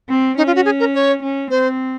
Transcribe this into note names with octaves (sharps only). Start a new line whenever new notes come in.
C4
C#4 D#4
F4
F#4
G#4
A#4
C#5
C#4
C4 C5